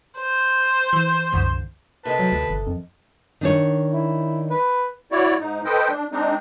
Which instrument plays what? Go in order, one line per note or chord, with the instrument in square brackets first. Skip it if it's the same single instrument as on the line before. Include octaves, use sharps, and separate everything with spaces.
[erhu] C5
[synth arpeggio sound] E3
C2 F#2 D3
[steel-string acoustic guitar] C3 A4 D#5 [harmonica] B4 A5
[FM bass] F#3
D2
G1
F2
[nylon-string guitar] D#3 D4 C#5
[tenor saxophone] E4
B4
[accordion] E4 F#4 C#5 D5
G#2 D#4
A4 B4 C5 D#5 G5
D4
G#3 C4 D4 D#4